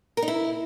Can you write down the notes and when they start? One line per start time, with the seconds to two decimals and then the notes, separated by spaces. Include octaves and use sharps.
0.17 A#4
0.22 D#4
0.28 E4